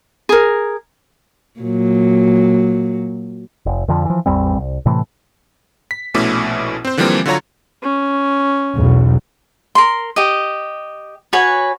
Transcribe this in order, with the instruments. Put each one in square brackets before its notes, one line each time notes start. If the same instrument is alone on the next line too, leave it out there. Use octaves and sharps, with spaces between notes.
[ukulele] G#4 A#4
[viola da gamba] A#2 F#3
[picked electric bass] F1
F2 D3 F3
E3 F3
A1 E2 G3 C4
C2
A2 C3 E3 A3
[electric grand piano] B6
A#1 B2 A3 C#4 E4 D6
C4 C5
D3 E3 F3 G3 A#3 C4
D3 F#3 F4 F#4 C#5 A#5
[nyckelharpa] C#4
[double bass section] B1 E2 F#3
[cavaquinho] A#4 C6
G4 D#5
F#4 B4 C#5 G#5